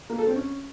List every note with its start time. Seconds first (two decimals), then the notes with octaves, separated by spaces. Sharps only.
0.10 A#3
0.18 A4
0.27 C4
0.36 C#4